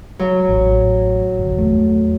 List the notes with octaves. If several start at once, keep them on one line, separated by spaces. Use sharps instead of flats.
F#3
A1
G1
E2 A3